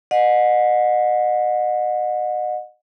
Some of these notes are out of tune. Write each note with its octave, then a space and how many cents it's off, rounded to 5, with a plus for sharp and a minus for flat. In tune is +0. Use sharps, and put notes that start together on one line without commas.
D#5 -30 F#5 -30